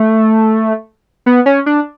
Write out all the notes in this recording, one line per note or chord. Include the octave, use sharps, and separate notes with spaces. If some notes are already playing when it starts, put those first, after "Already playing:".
Already playing: A3
B3
C#4
D4